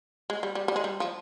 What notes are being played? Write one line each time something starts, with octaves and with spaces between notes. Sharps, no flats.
G#3
G3
G3
G3
G#3
G3
F3